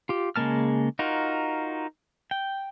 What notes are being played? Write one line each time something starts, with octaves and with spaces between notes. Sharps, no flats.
F4 G4
C#3 G#3 A#3 A5 F6
D#4 F4 F#4 A#4
G5